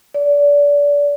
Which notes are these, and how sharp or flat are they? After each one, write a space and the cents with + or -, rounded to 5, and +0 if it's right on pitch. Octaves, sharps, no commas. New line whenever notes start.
D5 -30